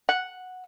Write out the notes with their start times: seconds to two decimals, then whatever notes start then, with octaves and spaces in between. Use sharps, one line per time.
0.09 F#5